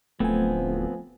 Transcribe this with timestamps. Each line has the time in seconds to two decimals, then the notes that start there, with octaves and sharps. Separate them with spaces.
0.20 D1 F3 A3 B3 C4 G#5